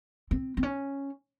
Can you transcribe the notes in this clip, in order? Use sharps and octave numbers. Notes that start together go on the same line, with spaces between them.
C4
C4
C#4